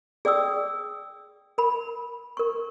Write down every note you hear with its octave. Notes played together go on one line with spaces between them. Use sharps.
G#4 D5 G5 D#6 E6
A#4 B5
A#4 C#6